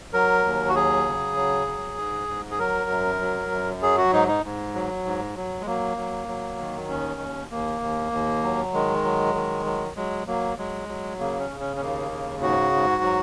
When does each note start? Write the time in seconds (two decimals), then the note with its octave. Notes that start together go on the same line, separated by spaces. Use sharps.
0.13 F#3 A#4
0.45 D#2
0.69 F#4
0.75 F#3 G#4
1.06 C#3
1.37 F#3
1.67 F#3
1.98 G#2
2.28 G#2
2.51 G#4
2.59 F#3 A#4
2.90 F#2
3.21 F#3
3.51 F#2
3.82 F#3 G#4
3.98 F#4
4.12 G#2 D#4
4.28 D#4
4.44 G#2
4.75 F#3
5.05 G#2
5.36 F#3
5.61 G#3
5.66 F#3 A#3
5.97 F#3
6.28 F#3
6.58 D#3
6.89 D#2 C#4
7.20 D#2
7.51 D#2 A#3
7.81 D#2
8.12 D#2
8.43 F#3
8.73 D#3 G#3
9.04 F#3
9.35 D#3
9.66 F#3
9.96 F#3 G#3
10.27 F#3 A#3
10.58 F#3 G#3
10.88 F#3
11.19 C#3 A#3
11.39 C#4
11.50 C#3
11.60 C#4
11.76 C#4
11.80 D#2 A#3
12.12 C#3
12.42 G#2 F#4
12.73 G#2
13.03 F#3